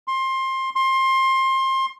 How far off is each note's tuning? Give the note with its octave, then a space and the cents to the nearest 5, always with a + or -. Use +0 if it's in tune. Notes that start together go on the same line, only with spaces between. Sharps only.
C6 +20
C6 +25